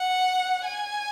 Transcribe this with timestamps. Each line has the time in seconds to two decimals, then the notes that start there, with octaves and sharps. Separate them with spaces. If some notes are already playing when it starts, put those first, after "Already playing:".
Already playing: F#5
0.65 G#5